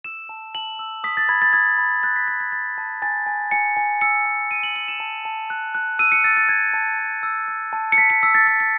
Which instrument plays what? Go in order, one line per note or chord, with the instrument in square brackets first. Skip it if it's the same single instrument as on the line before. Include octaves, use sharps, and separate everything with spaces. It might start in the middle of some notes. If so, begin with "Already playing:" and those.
[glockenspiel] E6 E7
A5
A5 F#7
E6
D#6 B6
A6
B5 G#6
A6
D#6 G#6
B5
F#6 A6
B6
D#6 A6
G#6
F#6 A6
A5
G#5 A6
G#5
G#5 C#7
G#5
E6 C#7
G#5
G#5 D#7
F#7
G#5 F#7
E7
A5
A5
F#6
F#6
E6 D#7
C#7
E6 A6
A6
E6 G#6
A5
A5
E6
E6
A5
C#7
A5 B6
C#7
E6 B6
A6
E6 A6
A6